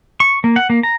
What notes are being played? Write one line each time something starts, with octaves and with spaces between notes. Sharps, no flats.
C#6
A#3
F#5
A#3
A#5